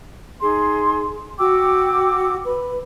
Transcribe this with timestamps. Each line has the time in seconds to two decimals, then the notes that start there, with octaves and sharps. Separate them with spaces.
0.41 D#4 G#4 C6
1.38 F#4 G5 D6 E6
2.44 B4